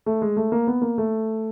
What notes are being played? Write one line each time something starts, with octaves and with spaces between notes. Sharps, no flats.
A3
G#3
A3
A#3
B3
A#3
A3